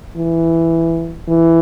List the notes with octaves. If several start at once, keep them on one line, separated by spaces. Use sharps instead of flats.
E3
E3